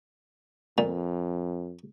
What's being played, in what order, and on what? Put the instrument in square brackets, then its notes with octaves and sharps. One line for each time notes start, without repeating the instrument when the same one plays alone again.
[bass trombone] F2 [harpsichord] A#2